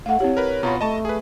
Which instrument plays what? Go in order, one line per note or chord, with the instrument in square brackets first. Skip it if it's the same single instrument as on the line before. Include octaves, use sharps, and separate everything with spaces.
[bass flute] A3 [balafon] F5 F#5
[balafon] C4 E4 G4 [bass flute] C#5
[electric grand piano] A#4 B4
[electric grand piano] B2 F4 F#4 [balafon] A#5 B5
[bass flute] A3 [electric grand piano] D#5 A5 C#6
[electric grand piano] G#4 B4